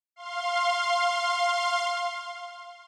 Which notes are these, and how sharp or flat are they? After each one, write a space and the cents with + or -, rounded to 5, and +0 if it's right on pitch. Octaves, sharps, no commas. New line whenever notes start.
F5 +0 C6 +20